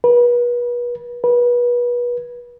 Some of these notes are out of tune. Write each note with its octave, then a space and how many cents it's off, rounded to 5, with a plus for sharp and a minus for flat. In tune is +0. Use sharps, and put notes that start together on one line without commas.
B4 -35
B4 -30